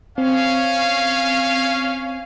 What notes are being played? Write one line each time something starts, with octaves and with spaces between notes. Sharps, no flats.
C4 C#4 F5